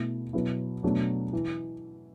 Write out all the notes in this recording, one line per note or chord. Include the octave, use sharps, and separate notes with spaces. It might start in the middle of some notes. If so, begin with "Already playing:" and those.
Already playing: B2 A3 E4
B2 F#3 B3 E4
B2 F#3 A3 D4
E3